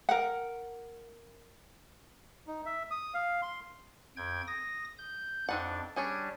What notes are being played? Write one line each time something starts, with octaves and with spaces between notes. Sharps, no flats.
A#4 F#5
D#4
E5
D#6
F5
C6
F2 G5 G#6
D#6 A#6
G6
F2 C4 D4 D#4 F#5
G3 C#4 D4 G#4 C#5